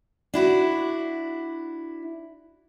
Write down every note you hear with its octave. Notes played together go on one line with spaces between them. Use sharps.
D4 E4 F#4